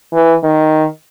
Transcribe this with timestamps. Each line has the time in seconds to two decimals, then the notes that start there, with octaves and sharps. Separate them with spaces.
0.14 E3
0.44 D#3